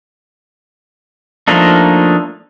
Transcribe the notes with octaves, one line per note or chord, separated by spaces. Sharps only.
F3 A3 A#3 D4 D#4